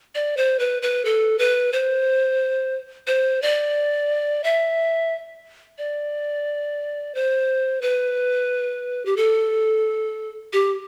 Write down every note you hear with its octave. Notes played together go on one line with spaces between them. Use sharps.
D5
C5
B4
B4
A4
B4
C5
C5
D5
E5
D5
C5
B4
G4
A4
G4